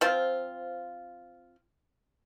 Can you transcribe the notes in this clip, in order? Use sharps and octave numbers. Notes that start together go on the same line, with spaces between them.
F3 C4 F4